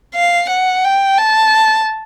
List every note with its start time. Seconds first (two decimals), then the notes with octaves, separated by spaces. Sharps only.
0.15 F5
0.50 F#5
0.84 G5
1.18 A5